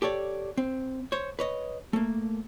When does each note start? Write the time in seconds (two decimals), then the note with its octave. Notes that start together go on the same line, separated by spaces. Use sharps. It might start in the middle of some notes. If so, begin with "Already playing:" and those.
0.02 G4 A4 C#5 D5
0.57 C4
1.12 C5 C#5
1.39 B4 C#5 D#5
1.93 A3 A#3